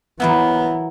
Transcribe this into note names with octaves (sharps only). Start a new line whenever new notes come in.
E3 F#3 A#3 B3 E4 F#5 A#5